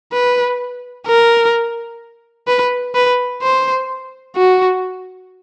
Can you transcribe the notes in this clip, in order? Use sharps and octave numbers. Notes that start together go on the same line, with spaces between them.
B4
A#4
B4
B4
C5
F#4